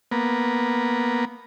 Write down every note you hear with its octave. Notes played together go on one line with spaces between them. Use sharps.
A#3 B3